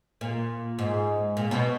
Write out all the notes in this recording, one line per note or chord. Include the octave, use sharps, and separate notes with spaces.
A#2
G#2
A#2
B2